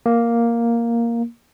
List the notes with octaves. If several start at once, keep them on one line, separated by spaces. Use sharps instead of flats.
A#3